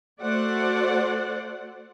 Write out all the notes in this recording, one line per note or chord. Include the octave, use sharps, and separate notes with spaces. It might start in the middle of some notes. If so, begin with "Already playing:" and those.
A3 F#4 C5 D5 F#5